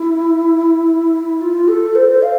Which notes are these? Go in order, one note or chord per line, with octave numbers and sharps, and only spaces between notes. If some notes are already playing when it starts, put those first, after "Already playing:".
Already playing: E4
F4
A4
C5
C5
F5